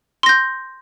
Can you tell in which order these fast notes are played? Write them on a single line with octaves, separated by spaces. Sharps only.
C6 A#6 G6